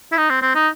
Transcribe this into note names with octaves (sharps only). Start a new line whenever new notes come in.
E4
D#4
C4
C4
D#4